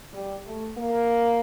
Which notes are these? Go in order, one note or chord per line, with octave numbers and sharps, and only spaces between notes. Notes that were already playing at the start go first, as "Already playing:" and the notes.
G3
A3
A#3